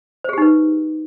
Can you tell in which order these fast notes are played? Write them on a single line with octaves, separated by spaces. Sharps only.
C5 G#4 G4 D#4 B4